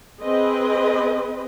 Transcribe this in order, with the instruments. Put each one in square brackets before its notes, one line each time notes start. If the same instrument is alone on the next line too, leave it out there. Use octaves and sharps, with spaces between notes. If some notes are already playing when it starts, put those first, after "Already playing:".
[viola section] C4 G#4 B4 D#5